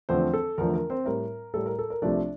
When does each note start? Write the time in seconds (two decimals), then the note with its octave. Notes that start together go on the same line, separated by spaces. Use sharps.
0.09 E2 D3 F3 A3 C4 C5
0.34 A4
0.58 E2 D3 F3 A3 A#4
0.74 A#4
0.90 C4 C5
1.05 A2 G3 A#4
1.54 A2 G3 A4
1.66 A#4
1.79 A4
1.90 A#4
2.02 C2 C3 F3 A3 D4 D5